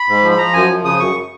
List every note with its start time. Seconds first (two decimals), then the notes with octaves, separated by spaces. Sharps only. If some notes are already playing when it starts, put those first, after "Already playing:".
Already playing: B5
0.09 G#2
0.24 F3
0.31 B5
0.38 F3 A#5
0.53 F#2 G#5
0.69 F3
0.84 C#3 D#6
1.00 F#2 C#6